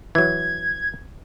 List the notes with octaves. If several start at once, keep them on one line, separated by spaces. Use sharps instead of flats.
E3 F#3 G#6